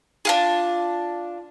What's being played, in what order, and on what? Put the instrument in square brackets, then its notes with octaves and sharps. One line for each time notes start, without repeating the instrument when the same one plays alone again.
[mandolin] D4 F4 G#4